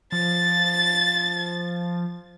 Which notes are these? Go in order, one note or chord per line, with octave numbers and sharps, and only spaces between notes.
F3 A6